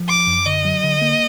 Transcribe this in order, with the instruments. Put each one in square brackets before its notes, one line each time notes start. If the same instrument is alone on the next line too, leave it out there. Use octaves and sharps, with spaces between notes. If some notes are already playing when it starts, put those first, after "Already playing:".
Already playing: [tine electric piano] F3
[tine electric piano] G#1 [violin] D6
[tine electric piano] F#2
[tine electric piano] D3 [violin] D#5
[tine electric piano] F#3
D3
A#3